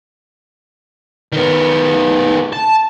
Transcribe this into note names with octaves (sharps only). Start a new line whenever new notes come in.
D#3 B3
A5